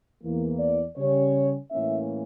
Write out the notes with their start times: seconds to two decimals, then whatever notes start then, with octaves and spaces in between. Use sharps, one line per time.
0.23 E2 E3 A#3
0.59 D5
0.97 C#3 G3 C#4 C#5
1.71 A2 E3 A#3 C#4 E5